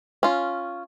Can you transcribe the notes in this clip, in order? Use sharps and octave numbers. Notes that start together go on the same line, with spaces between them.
C#4 F4